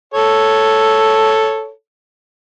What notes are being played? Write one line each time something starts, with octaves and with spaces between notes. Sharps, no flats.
A4 C#5